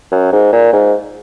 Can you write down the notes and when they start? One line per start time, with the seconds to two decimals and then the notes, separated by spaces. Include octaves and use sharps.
0.11 F#2
0.32 G#2
0.53 A#2
0.73 G#2